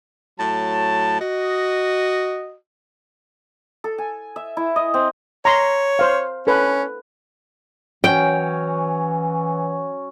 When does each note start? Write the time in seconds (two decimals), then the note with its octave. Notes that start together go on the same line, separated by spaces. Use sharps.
0.40 A2 F#3 A5
1.21 F#4 D#5
3.84 A4
3.98 G#5
4.36 E5
4.57 E4
4.76 D#5
4.94 C4
5.45 C#5 A#5 C6
5.99 C5 F5
6.47 C#4 A4 B4
8.04 E3 F#3 C#4 G5